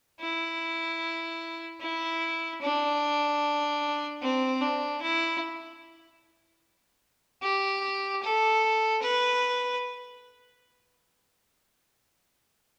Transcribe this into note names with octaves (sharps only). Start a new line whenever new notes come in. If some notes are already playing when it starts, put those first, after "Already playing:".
E4
E4
D4
C4
D4
E4
G4
A4
B4